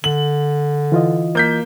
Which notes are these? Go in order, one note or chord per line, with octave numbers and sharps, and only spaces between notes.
D3 F#7
E3 F4 D#5
A#3 G6 B6